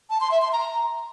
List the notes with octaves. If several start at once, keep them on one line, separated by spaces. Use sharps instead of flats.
A5
C6
E5
C6
A#5